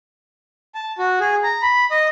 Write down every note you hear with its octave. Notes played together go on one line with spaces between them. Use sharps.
A5
F#4
G#4
A#5
B5
D#5